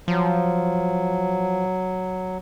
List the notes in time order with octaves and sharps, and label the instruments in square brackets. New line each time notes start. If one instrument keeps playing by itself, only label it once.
[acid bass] F3 [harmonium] F#3